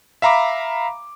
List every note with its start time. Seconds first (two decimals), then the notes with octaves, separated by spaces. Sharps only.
0.22 E5 F5 A#5 B5 D6